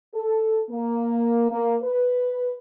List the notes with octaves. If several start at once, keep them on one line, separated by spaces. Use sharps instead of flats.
A4
A#3
A#3
B4